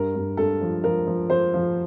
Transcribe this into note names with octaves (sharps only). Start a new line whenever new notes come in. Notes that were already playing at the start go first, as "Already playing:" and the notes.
Already playing: G2 A#4
G2
G2 A4
F3
F3 A#4
F3
F3 C5
F3